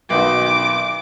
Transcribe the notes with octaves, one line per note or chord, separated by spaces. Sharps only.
B1 D#3 F#4 D6